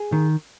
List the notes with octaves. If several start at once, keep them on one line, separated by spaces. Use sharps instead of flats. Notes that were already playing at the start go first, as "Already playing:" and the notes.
Already playing: G#4
D#3